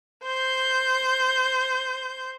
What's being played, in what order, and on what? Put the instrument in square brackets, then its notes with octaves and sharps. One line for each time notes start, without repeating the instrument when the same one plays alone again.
[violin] C5 G6